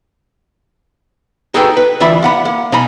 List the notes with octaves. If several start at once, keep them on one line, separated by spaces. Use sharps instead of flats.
D#4 F#4 G#4 A4 B4 G5
B4
D2 E3 F4 E5 B5
A#3 F#5 B5
A#3
B2 D#4 G#5 A#5 B5